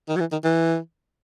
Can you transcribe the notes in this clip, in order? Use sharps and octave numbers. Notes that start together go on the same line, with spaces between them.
D#3
F#3
E3
D#3
E3